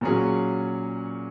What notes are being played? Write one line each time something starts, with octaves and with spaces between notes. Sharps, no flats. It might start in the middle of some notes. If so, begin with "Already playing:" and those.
A#2 F#3 C#4 G#4